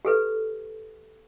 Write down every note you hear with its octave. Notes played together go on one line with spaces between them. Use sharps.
G4 A4 B4